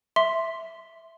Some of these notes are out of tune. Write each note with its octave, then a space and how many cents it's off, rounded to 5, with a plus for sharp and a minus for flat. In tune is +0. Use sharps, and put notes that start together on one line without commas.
E5 +0 C6 +0